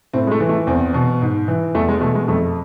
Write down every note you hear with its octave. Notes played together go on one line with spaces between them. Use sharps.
A2 C4
G#3
A3
E3
A3
E2 C4
B2
G#2
E3
E2 A3
G#3
B2 A3
G#3
F2 A3